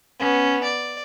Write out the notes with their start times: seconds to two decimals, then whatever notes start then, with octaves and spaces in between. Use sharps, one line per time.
0.19 B3 C#4
0.63 D5